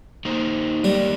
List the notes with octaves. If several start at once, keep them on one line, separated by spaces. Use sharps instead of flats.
A#3 D#4 C5
G3 A#3 G4 A#4